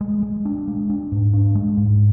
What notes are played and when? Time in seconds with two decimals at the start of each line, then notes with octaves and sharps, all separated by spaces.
0.01 G#3
0.23 G#3
0.45 D4
0.68 G#3
0.90 D4
1.12 G#2
1.33 D4
1.55 G#3
1.77 G#2